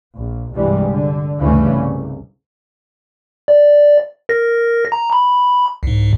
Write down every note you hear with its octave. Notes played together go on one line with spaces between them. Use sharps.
A#1
C2 G2 E3 G3 G#3
D3
D2 G2 C#3 E3 A3 C#4
C2
D5
A#4 A#6
A#5
B5
C2 G#2